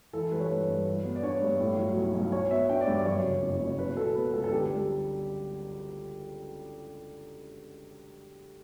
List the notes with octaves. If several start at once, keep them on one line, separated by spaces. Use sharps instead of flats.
E3 A4
G3 B4
C#5
G2 B4
G2
F#3
B3
D5
D4 C#5
G2
A2
F#3
B1
B1
F#3 C#5
B3 E5
D4 G5
D5
G2
D5
F#2 C#5
C#3
F#1
F#1
B2 B4
F#3 A4
B3 B4
C#2 A4
A4
D3 G4
G3